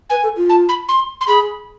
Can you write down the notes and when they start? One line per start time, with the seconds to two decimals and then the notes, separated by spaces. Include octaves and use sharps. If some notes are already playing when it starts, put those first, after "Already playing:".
0.10 B4 G#5
0.23 A4
0.36 F4
0.49 A5
0.69 B5
0.89 C6
1.21 C6
1.28 G#4 B5